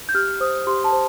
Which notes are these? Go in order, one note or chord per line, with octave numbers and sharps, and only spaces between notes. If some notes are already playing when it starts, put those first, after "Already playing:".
G6
G4 F6
C5 D#6
G4 C6
A5
C5